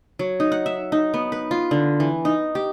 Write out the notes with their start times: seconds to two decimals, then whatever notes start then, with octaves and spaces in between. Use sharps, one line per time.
0.19 F#3
0.40 D#4
0.52 F#5
0.66 E5
0.92 D#4
1.14 B3
1.32 B4
1.51 F4
1.71 D3
2.00 E3
2.25 D#4
2.55 G4